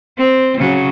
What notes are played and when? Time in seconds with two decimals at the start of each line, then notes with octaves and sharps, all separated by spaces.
0.19 C4
0.58 C#3 F#3